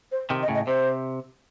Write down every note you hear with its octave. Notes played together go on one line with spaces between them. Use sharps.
C5
C3 D#3
D#5
A2 C#3
D#5
C3 C5